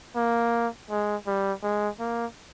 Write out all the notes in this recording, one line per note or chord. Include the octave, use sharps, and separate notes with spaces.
A#3
G#3
G3
G#3
A#3